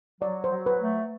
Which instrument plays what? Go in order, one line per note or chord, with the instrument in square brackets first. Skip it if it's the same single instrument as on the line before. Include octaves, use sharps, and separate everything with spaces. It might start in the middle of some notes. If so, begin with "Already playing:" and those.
[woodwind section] F#3 [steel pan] D5
[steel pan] C5
[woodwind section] F#3
[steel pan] B4
[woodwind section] A3